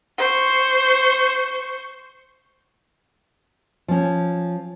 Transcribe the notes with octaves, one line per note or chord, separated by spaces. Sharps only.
C5 C#6
F3 C#4